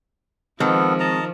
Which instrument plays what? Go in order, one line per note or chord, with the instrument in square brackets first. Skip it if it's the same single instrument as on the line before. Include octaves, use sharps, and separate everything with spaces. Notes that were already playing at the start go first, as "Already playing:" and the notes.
[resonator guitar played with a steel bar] D#3 [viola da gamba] F3 [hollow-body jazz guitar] G#3 C4 [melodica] B3 A4
[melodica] D#5 A5 A#5